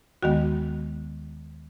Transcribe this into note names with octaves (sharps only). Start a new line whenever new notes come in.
D#2 D#3 G#3 B3 F#4